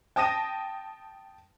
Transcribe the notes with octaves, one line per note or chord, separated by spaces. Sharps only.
G5 A5 D#6 A#6 D#7